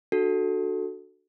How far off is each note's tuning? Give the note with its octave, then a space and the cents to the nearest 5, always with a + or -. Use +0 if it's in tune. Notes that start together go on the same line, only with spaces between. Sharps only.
D4 +30 F#4 +10 A4 +0